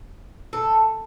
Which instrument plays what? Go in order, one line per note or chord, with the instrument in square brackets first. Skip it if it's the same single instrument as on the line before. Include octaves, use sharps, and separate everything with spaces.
[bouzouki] A4